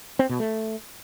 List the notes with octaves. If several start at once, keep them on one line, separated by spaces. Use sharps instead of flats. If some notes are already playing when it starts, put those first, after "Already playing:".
C4
B2
A3